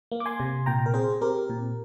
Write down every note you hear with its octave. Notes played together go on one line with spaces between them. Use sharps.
A#3
D6
G#5 C6
C3
A#2 G5 A#5
A#4
C4 G#4 C5
C4 G4 A#4
A#2